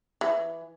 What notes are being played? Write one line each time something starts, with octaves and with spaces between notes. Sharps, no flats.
E3